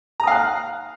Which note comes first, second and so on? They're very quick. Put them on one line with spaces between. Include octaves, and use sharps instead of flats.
A#5 D#6 F5 F#6